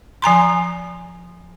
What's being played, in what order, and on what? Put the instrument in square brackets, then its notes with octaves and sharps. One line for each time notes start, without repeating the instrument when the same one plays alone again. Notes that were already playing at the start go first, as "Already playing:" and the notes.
[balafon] F3 G#5 A#5 C6